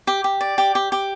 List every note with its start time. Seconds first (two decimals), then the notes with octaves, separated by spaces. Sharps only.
0.07 G4
0.24 G4
0.41 D5
0.58 G4
0.75 G4
0.92 G4